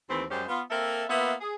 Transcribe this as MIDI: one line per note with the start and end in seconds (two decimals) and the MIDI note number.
0.10 0.25 39
0.10 0.25 52
0.10 0.25 57
0.10 0.25 60
0.31 0.44 42
0.31 0.44 55
0.31 0.44 56
0.31 0.44 61
0.31 0.44 67
0.31 0.44 72
0.48 0.62 59
0.48 0.62 65
0.71 1.04 58
0.71 1.04 60
0.71 1.04 69
0.71 1.04 70
0.71 1.04 76
1.10 1.33 58
1.10 1.33 59
1.10 1.33 65
1.10 1.33 71
1.10 1.33 76
1.41 1.56 68